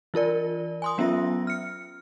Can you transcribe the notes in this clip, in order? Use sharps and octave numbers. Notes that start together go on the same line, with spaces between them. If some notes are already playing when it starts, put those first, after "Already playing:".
E3 F4 A#4 D5
G#5 C6 D#6
F#3 B3 C#4 F4 E5 A#6
F6 C#7